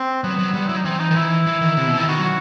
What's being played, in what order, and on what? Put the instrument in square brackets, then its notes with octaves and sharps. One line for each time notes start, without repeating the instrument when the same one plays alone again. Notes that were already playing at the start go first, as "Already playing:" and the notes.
Already playing: [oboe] C4
[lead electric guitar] F#3 [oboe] B3
[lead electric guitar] F#3
[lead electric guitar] G3 [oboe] B3
[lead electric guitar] F#3 [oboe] E4
[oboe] D#4
[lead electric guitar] E3 [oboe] C4
[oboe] D#4
[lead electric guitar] D#3
[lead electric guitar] E3 [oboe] E4
[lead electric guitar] E3
D#3
C3
B2
[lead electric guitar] D#3 [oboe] E4
[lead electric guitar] D#3 [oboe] F#4
[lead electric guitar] F#3
[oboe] F#4